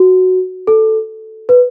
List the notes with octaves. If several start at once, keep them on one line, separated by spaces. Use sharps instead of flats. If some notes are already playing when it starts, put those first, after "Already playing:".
Already playing: F#4
A4
B4